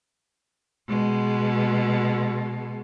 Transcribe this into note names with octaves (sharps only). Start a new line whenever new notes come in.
B2 G#3